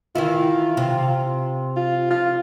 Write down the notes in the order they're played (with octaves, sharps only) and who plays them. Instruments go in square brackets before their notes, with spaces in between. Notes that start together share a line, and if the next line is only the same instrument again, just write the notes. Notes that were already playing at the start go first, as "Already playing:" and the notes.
[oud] D#3 E3 E4 [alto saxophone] F4
[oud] C3
[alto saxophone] F4
F4